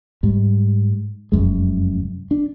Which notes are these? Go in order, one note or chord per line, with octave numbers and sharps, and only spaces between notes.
G#2 G3
F1 F#2 G#3
D4